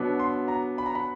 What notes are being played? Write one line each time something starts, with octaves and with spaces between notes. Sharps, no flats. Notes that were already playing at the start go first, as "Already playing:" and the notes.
Already playing: B2 F#3 B3 D4
C6
A#5
B5
A#5
B5